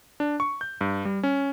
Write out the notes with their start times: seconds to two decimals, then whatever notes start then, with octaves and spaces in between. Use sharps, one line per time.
0.20 D4
0.40 C#6
0.61 G6
0.81 G2
1.05 G3
1.23 C#4